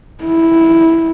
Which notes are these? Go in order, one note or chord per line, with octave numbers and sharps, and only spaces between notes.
E4